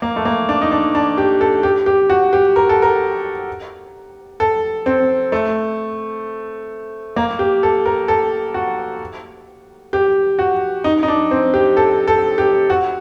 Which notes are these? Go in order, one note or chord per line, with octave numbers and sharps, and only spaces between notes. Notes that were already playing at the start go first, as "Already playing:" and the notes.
A#3
A3
A#3
D4
D#4
D4
D4
G4
A4
G4
G4
F#4
G4
A#4
A4
A#4
A4
C4
A3
A#3
G4
A4
A#4
A4
F#4
G4
F#4
D#4
D#4
D4
C4
G4
A4
A4
G4
F#4